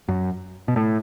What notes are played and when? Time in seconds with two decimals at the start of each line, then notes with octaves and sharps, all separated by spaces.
0.08 F#2
0.68 B2
0.76 A2